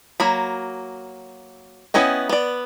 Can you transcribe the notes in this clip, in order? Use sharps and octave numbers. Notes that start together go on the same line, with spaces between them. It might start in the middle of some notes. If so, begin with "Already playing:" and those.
F#3 A#3 B5
B3 C#4 E4 D#5 G5
B3 D5